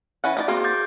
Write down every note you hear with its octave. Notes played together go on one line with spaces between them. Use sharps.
E3 C#4 F#5
D#4 G4 D5
A#3 C4 F#4 G#4 A#4
D6 G6 A6